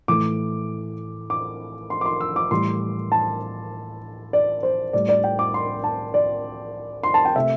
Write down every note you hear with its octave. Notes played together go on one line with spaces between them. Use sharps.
A2 E3 A3 D6
D6
C6
D6
C6
E6
D6
A2 E3 G3 C6
A5
D5
C5
A2 G3 D5
D5
G5
D6
C6
A5
D5
C6
A5
G5
C3 A3 E5